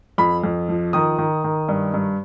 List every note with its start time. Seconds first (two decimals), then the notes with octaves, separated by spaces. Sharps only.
0.18 F2 B5
0.44 F2
0.69 F3
0.93 D#3 D#6
1.18 D#3
1.44 D#3
1.69 G2
1.94 G2